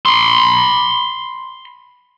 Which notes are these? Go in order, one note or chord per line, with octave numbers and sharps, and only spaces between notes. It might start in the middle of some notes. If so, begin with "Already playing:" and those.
B5 C6